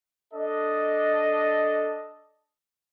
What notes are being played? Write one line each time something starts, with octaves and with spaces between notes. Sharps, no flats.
D4 A4 D#5